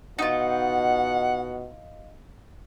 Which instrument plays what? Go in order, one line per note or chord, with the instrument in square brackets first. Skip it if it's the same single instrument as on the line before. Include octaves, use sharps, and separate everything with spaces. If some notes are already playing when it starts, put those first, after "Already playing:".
[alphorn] B2 [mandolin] D#4 F4 [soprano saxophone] F#5